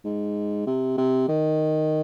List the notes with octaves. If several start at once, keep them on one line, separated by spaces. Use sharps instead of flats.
G#2
C3
C3
D#3